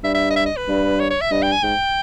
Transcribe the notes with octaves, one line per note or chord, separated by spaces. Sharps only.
G2 E5
E5
D#5
E5
D#5
B4
G2
C#5
C#5
E5
G2 D#5
G5
G#5
G#2 G5